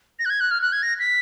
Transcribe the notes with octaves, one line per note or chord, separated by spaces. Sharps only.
A#6
F#6
G#6
F#6
F6
F#6
G#6
A#6
B6